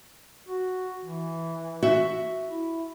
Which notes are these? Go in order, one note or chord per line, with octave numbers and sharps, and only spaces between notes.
F#4
E3
F#4 E5
E4